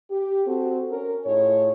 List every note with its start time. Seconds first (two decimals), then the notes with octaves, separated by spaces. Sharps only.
0.11 G4
0.46 C4 F#4 A4
0.90 C#4 A#4
1.25 A2 D#4 F4 G#4 C#5